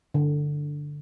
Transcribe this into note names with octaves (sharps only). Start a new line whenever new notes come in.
D3